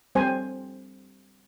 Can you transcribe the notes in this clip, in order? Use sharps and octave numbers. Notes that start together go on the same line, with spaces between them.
G3 C4 C5 G#5